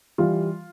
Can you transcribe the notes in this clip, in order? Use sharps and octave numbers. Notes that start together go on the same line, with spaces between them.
E3 G3 F4